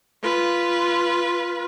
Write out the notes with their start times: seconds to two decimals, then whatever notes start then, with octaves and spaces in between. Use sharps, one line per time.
0.22 F4 B4